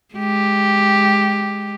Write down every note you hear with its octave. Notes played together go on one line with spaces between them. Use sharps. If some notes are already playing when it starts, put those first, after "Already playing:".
G#3 G4